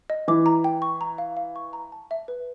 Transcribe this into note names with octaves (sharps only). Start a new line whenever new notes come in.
D#5
E3 D6
A#5
G5
C#6
A#5
F5
F5
C#6
A#5
A5
E5
B4